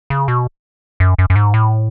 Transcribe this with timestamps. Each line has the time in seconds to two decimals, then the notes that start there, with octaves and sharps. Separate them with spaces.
0.10 C#3
0.28 B2
1.00 F#2
1.19 F#2
1.30 F#2
1.36 G#2
1.54 A2